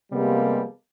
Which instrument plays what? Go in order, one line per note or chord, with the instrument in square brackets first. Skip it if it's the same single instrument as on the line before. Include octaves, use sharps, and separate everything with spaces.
[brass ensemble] C3 F3 G3 G#3 A#3 B3